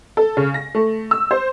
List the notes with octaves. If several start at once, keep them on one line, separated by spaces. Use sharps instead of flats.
A4
C#3
A#6
A3
E6
C5